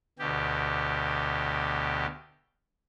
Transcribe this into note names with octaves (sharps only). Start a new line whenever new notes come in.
D2 B2 G4